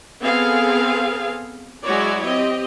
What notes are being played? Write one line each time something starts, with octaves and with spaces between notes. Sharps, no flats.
B3 C4 G#4 A4 F5
F#3 G#3 E4 F#4 C#5 D5
C4 G4 D#5